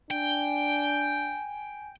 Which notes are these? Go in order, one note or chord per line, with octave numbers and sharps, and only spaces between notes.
D4 G5 G#5